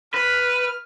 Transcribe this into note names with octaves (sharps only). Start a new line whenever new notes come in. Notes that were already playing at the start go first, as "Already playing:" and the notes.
B4 F6